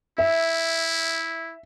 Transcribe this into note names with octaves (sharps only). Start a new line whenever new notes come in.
E4 E5